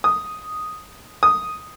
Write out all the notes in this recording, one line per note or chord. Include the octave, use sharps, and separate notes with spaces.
D#6
D#6